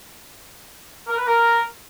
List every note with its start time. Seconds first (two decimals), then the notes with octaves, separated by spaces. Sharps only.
1.08 A#4
1.17 B4
1.26 A#4